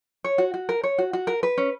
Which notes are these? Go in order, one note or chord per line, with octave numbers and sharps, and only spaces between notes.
C#5
F#4
F#4
A#4
C#5
F#4
F#4
A#4
B4
C#4